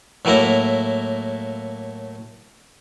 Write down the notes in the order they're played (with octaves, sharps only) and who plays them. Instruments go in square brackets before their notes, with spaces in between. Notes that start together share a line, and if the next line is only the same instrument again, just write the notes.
[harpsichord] A2 F#3 A#3 E4 A#5